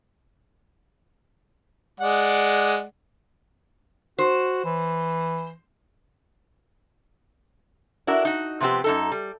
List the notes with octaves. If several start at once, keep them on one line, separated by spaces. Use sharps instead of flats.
G#3 D5 F#5
F#4 C5
E3
D4 E4 F#4 A#4
D#4 F#4
C3 F3 B3 C4 G4
F#2 D#4 A4
G3